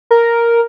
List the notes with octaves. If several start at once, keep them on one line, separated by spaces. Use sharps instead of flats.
A#4